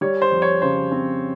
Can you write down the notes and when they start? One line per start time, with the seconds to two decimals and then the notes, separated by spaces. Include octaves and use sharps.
0.01 G3 C#5
0.22 C5
0.31 F2
0.42 C#5
0.62 C#3 C5
0.92 C4